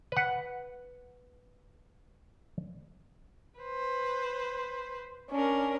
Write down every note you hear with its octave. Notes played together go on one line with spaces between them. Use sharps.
B4 F#5
B4 C5
C#4 D4 A#4